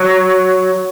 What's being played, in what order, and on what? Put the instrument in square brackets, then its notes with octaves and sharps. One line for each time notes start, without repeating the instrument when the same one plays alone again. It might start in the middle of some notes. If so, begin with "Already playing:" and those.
Already playing: [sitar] F#3